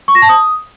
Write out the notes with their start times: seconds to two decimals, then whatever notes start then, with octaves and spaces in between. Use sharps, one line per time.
0.08 C#6
0.15 A#6
0.22 A5
0.29 D#6